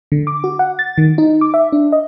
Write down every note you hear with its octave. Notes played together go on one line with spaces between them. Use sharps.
D3
D6
F#4
F#5
A6
D#3
D#4
D6
E5
D4
D#5